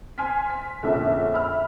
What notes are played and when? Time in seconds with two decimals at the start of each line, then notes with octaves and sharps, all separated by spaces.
0.18 G#5 C6 F6 B6
0.50 B6
0.83 A#1 F2 D3 C#4 E5
1.33 E5 B5 E6 F6